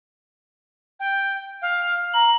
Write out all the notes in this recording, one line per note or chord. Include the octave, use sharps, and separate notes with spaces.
G5
F5
A#5 F#7